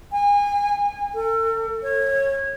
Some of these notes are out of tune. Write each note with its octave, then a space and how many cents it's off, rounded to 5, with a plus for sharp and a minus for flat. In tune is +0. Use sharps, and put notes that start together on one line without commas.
G#5 -30
A4 +40
C#5 -20